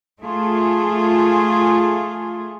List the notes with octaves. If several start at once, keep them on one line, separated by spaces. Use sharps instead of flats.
A3 F4 G#4